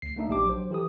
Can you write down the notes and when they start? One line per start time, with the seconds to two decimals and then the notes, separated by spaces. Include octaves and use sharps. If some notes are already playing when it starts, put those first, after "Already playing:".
0.02 D2 C7
0.16 A3 A#3 D4 D#4 E5
0.28 A#1 D4 G4 D6
0.45 F#3 C5
0.71 E3 G4 A4 D#6